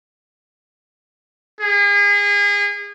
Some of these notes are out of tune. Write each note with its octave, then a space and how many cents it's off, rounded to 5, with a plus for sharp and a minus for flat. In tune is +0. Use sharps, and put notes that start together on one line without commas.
G#4 -35